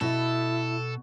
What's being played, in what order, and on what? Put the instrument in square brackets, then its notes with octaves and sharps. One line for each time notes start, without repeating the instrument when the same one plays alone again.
[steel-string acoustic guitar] B2 [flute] E4 [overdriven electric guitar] A4